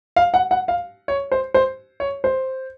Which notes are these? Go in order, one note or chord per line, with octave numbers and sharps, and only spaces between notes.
F5
F#5
F#5
F5
C#5
C5
C5
C#5
C5